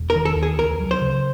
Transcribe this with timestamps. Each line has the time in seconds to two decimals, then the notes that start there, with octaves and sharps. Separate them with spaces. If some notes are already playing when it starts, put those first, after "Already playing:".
Already playing: E1
0.10 A#4
0.15 D#3
0.25 A4
0.36 D#2
0.43 G#4
0.58 C#2 A#4
0.80 F#3
0.91 C5
1.01 C#3